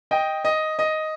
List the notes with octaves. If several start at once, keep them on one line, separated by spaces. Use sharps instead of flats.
D#5 G5
D#5
D#5